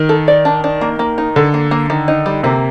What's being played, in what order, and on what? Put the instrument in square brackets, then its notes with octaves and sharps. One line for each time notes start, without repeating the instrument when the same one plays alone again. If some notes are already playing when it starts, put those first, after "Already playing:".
Already playing: [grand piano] D#3
[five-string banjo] A4
D5
D4
D4
A#3
A#3
D#4
[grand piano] D3 [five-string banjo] A4
[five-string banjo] A#3
A#3
D#3
D#4
G3
[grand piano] C3 [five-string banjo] A#3